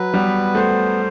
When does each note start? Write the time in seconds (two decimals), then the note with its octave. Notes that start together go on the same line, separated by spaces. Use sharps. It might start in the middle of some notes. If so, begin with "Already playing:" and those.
Already playing: F#3 B4
0.14 G3 B3
0.55 A3 C5